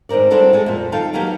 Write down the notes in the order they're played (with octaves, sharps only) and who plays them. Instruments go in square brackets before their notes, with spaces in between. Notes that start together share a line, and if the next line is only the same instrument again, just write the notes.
[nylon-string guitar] G#2 D#3 C4 A#4 D5
G3 C4 D4 E4 F#4 A4
G#3 A4
F2 A#2
D#3 F4 A4 F5 G5 A5
D#3 F#3 A#3 B3 G4